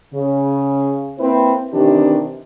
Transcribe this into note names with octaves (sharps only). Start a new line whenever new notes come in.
C#3
A#3 C4 E4 B4 C5
C3 D#3 E3 D4 G4